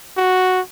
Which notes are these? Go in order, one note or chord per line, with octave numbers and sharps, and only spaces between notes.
F#4